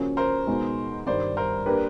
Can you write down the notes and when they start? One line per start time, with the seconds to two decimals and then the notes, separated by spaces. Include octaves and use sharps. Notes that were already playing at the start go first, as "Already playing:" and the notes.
Already playing: C#3 F3 A#3 C#4 F#4
0.17 A#4 C5
0.47 B2 G#3 B3 D#4
1.06 G2 D#3 G3 C5 D5
1.37 A#4 C5
1.66 A#3 D4 G4 B4